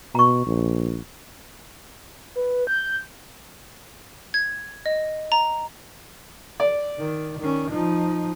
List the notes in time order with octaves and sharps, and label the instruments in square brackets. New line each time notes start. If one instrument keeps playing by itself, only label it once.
[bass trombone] B2 [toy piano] A#5 C#6
[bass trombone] A#1
[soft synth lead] B4
G6
[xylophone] G#6
D#5
A#5
[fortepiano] D5
[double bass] D#3
D#3 C#4
F3 D#4